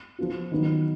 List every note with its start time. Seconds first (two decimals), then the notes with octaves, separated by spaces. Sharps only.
0.19 F3 B3 F4
0.52 D#3 F#3 B3 D#4